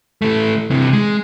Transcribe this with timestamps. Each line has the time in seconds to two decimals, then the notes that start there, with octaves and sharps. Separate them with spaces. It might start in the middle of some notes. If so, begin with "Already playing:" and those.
0.22 E3 A3
0.71 C3 E3
0.93 G#3